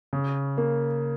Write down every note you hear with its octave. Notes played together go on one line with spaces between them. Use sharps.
C#3
A#3